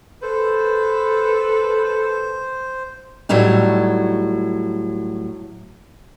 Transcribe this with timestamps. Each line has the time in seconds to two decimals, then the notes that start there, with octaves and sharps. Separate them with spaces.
0.22 A4 B4 C5
3.29 A2 F#3 G3 A3 D#4